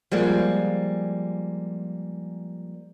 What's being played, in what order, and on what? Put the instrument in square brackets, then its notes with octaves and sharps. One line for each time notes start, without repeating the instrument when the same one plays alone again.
[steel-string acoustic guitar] F3 G3 G#3 A#3